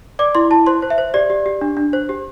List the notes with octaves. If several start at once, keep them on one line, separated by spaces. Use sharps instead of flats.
D5 D6
E4 C6
E4 A5
C5 C6
C5
E5
C5
G4 D5
G4
G4
D4
D4
C5
G4